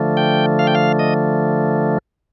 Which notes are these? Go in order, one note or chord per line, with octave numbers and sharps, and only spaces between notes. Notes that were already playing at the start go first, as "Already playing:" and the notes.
Already playing: D3 F3 A3
G5
F5
G5
F5
D#5